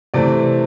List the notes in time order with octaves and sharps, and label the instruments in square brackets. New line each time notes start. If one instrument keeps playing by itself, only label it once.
[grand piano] C3 E3 A3 C4 D5